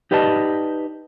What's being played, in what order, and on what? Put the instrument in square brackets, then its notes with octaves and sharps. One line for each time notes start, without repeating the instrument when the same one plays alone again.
[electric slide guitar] D#4 G4 B4 D5 D#5 A5